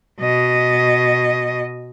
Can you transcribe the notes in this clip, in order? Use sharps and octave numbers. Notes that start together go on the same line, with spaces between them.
B2 D#5